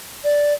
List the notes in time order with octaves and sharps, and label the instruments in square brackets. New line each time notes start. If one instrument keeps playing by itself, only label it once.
[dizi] D5